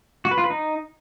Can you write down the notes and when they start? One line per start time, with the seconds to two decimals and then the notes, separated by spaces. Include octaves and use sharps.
0.25 F#4
0.31 B4
0.38 F4
0.44 B4
0.50 D#4